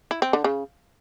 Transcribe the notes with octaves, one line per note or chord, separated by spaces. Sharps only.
E4
C4
D3
C#3